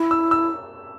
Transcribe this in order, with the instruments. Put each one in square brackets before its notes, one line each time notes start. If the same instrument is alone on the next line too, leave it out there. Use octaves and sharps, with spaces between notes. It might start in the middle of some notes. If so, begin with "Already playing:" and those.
Already playing: [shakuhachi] E4
[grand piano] E6
E6